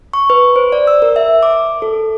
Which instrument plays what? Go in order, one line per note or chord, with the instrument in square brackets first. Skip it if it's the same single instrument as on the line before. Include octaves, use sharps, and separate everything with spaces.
[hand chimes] C#6
B4
C5
D5
E6
A#4
E5
D6
A4